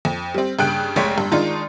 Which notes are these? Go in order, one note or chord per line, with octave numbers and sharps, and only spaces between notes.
F2
G3 C4
G2 C#3 G5 F#6 D7
F1 A#1 G#3 C#5 G5 B6
G2
D#3 G#3 D4 D#4 F4